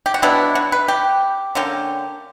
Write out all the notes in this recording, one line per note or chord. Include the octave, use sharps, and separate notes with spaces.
G4
F#4
B2 F#3 B3 D4 E4
F#4
B4
G4
D3 A#3 C#4 G4